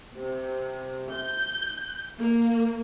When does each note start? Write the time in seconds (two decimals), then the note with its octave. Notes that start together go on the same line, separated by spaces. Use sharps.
0.16 C3
1.11 G6
2.19 A#3